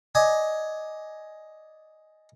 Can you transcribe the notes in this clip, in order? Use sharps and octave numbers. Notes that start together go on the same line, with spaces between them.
D5 D#5 G#5